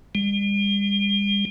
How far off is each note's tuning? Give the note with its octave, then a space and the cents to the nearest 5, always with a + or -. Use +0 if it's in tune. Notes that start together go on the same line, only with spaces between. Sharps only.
G3 +45